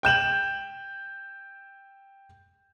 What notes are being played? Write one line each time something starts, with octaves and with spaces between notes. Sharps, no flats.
G5 G6 E7 F#7